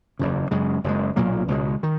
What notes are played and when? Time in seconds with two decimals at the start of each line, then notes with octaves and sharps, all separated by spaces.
0.19 F#1 E2 C#3
0.51 F#2 C#3 G#3
0.84 F#1 F#2 C#3 G#3
1.16 B1 A#2 F#3 A#3
1.48 C#2 B2 G#3
1.83 D#3